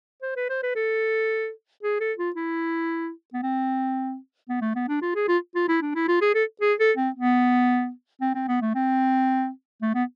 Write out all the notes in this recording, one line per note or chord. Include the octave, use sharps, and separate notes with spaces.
C5
B4
C5
B4
A4
G#4
A4
F4
E4
B3
C4
B3
A3
B3
D4
F4
G#4
F4
F4
E4
D4
E4
F4
G#4
A4
G#4
A4
C4
B3
C4
C4
B3
A3
C4
A3
B3